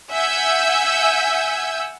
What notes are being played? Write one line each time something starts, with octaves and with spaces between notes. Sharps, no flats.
E5 F#5 G#5 E6 G6